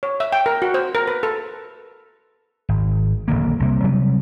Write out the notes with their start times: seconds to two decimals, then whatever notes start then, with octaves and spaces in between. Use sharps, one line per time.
0.03 C#5
0.20 E5
0.32 G5
0.46 A#4
0.62 F#4
0.74 C5
0.95 A#4
1.08 B4
1.23 A4
2.69 G#1
3.28 D#1 A#1 D3 A#3
3.60 C2 C3 A#3
3.83 C3 F#3 G3 B3